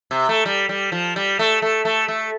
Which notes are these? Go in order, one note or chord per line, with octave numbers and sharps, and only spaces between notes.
C3
A3
G3
G3
F3
G3
A3
A3
A3
A3